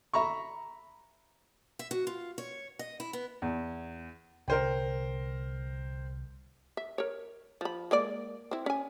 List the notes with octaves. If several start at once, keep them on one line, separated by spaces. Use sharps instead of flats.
E5 A#5 B5 C#6
E5
F#4
F4
C#5
D#5
E4
B3
E2
C2 D3 A#4 C5 G5
E5
A#4 C#5
F3 B5
G#3 A#3 D5
C4 E4
C#4 G#5